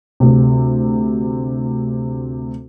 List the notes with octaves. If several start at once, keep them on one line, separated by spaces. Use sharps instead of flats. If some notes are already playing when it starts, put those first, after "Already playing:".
D2 C3